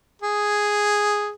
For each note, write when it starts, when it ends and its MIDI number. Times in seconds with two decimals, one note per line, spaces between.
0.22 1.32 68